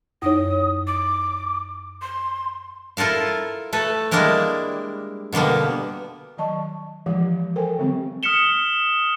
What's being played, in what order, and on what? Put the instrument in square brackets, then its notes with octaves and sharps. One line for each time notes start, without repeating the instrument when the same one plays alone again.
[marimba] F#2 D#4 C#5 [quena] D#6
[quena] D6
C6
[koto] E4 F4 A4 A#4 F5
A3 A4 B4
G3 G#3 A#3 D4 E4 A#4
B2 D3 G3 A#3 B3
[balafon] D#3 F#3 D5 D#5 A5 C#6
E3 F3 G#3 G4 F#5 D6
A4 A#4 C5 G5 G#5
D3 F#3 G#3 C4 G4
[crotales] D#6 F6 B6 C#7 E7 G7